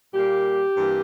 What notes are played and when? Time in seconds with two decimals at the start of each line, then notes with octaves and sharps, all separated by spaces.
0.14 A#2 G3 A#3 G4
0.77 G2 E3 A#3